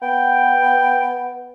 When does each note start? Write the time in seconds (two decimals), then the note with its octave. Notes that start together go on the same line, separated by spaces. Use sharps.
0.02 B3 G5